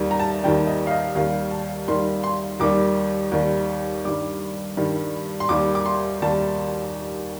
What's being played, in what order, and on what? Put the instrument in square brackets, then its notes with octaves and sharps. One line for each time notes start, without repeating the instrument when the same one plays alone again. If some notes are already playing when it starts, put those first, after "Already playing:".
Already playing: [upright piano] D#2 D#3 G3
A#5
A5
D#2 D#3 G3 G5
D#5
F5
D#5
D#2 D#3 G3 F5
A5
D#2 D#3 G3 C6
C6
D#2 D#3 G3 D6
D#2 D#3 G3
G2 D#3 G3 D6
G2 D#3 G3
C6
D#2 D#3 G3 D6
D6
C6
D#2 D#3 G3 A5